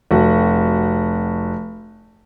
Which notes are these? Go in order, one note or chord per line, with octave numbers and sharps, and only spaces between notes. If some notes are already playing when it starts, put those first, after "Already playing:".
F1 F#4